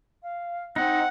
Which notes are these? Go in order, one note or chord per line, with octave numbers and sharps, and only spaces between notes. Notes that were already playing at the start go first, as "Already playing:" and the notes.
F5
C4 D#4 F#5